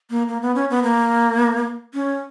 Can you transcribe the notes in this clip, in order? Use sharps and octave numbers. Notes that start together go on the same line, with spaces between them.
A#3
A#3
B3
C#4
B3
A#3
C#4